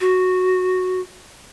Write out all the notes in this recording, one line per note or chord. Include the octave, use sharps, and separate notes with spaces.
F#4